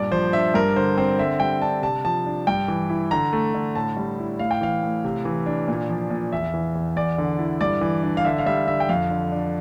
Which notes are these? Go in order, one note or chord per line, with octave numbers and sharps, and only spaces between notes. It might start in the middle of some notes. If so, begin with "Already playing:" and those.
Already playing: G2 A#2 D5
F3 C5
D4 E5
G2 A#4
D3 C5
C4 C5
D3 E5
G3 G5
D4 A5
C3 A5
F3 A5
D4
G2 G5
E3
E4
D3 A#5
A3
D3
A2 A5
G3
E4
A2 F5
G5
E3 F5
A2
C3
E3
D4
A#2
F3
A#2
E2 E5
E3
E2
E2 D5
D3
E4
G2 D5
E3
D4
F5
D3 E5
F5
G3 E5
D3 E5
G5
F2 F5
D3
D4